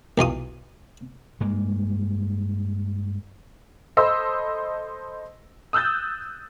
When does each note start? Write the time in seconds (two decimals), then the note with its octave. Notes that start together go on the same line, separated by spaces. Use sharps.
0.18 B1 E2 F4 D#6
1.40 G2 G#3 A#3
3.97 A4 C5 D#5 B5 C6 E6
5.73 D#6 E6 F#6 G6 A6